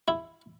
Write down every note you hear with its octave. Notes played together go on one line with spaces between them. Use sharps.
E4